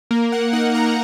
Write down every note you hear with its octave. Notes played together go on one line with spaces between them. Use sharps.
A#3 A#4
F#5
D#4 F#5
A#5